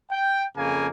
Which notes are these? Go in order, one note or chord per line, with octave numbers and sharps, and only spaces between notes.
G5
F2 C#3 A#3 G#5